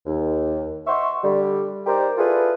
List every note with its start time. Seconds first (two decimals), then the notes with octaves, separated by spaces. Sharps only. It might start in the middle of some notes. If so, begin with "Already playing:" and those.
0.06 D#2
0.87 D#5 E5 F#5 C6 C#6
1.24 D3 G3
1.86 D#4 G4 A#4 C5 D5 A#5
2.18 E4 F4 G#4 A4 B4 D5